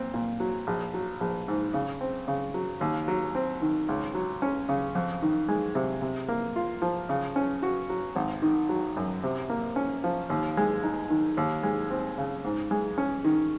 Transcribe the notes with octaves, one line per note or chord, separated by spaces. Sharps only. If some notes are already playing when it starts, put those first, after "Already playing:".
Already playing: A#2 C4
A#2
F#3
A#1
F#3
A#1
G#2
C#3
C4
C#3
F#3
D#2
F#3
C4
D#3
C#2
F#3
C#4
C#3
F2
D#3
G#3
C3
C3
A#3
F4
F3
C#3
C#4
F#4
F#3
G#1
D#3
F#3
F#2
C3
A#3
C#4
F3
D#2
G#3
D#4
D#3
D#2
G#3
C4
C#3
G#2
G#3
C#4
D#3